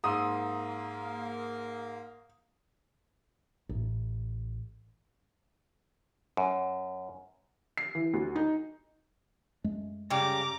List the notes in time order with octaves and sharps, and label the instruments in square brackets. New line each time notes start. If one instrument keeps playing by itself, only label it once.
[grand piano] G#2 C6 E6 [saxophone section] A#3 [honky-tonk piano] D#6
[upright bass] A1
[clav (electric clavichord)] F#2
[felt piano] C7
E3
D2
D#4
[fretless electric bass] F#2 G#3 A3
[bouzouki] C#3 G3 G4 [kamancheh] A#5 D6